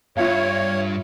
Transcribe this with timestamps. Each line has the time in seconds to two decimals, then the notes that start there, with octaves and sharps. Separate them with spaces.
0.17 G2 F4 C#5 E5 F5